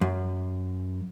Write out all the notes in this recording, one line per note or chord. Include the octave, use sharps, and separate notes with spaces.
F#2